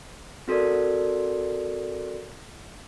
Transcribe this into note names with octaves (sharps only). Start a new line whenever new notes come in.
C4 F#4 A4 A#4 D5